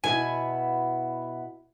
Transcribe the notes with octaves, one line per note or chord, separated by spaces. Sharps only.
B2 B3 E4 G#5